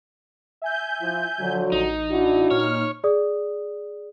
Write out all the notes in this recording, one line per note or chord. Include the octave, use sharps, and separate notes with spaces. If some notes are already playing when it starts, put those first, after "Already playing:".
E5 G#5 G6
F3 E4
D3 F3 F#3
A1 D#4
D4 E4 F#4
A#2 D#4 C#5 F6
G#4 D5 D#6